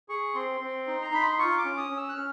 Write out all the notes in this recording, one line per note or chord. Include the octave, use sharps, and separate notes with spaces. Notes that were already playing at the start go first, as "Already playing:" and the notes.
G#4 C#6
C4 C6
C4
D#4
A#5
D#4 B5
C6
F4 C#6
D6
C#4
D#6
C#4
E6
F#6
C#4 F6